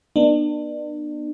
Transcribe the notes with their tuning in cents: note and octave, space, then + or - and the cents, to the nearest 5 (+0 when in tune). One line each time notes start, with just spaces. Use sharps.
B3 -30 D4 +35